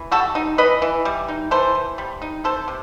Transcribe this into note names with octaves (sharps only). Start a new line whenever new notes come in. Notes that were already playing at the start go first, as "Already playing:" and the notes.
Already playing: E3
G3 F#4 A4
D#4
E3 B4 D#5
E3
G3
D#4
E3 A4 C5
E3
G3
D#4
C3 A4 C5
C3